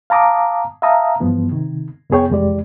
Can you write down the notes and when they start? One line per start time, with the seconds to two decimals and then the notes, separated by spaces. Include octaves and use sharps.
0.10 F5 A5 A#5 D6 D#6
0.82 E5 F5 A5 A#5 D#6
1.20 G2 E3 F3 B3
1.51 C3 D#3
2.10 C2 F2 B3 G#4 C#5 G5
2.30 C2 F2 E3 G#3 G4 D5